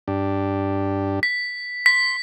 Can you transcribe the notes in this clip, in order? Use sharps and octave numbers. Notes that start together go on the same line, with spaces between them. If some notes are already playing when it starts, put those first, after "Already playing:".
G2 D4 G4
B6
C6 B6